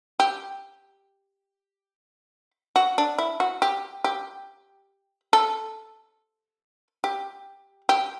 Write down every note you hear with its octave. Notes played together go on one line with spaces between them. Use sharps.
G4
F#4
D4
E4
F#4
G4
G4
A4
G4
G4